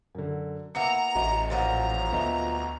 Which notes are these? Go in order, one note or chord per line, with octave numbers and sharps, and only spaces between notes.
F#2 D3
A#3 B3 E4 E5 A#5 C#7
A1 F#4 D#5 E5
A#2 F3 F#3 A#5
D2 B3 D#5 E5